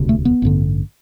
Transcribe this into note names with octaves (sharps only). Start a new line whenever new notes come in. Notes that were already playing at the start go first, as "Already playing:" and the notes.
Already playing: E1 D2 C3
A3
B3
A1 G2 D3